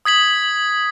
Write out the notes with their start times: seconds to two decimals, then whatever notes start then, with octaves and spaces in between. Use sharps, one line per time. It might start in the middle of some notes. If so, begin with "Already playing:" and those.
0.05 D#6 G#6 B6 F#7